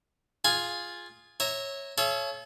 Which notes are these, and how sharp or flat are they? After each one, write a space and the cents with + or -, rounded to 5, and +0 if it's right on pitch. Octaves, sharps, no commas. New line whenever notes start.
F4 +0 G#4 +0 G#5 +0
C#5 -15 E5 -20 A#5 +0
A4 -40 C#5 +0 E5 +45